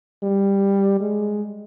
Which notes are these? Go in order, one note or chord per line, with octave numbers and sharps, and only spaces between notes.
G3
G#3